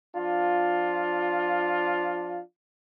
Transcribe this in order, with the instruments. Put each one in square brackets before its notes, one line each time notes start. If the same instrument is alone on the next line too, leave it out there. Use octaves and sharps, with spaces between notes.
[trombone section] F3 D4 F4